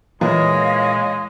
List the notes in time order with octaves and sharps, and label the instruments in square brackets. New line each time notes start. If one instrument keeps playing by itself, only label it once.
[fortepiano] E2 [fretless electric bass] A#2 E3 [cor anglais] G#3 [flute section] C#5 D#5 F5